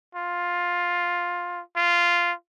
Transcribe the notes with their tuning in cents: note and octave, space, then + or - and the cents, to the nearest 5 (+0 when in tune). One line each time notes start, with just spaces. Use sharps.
F4 +10
F4 -10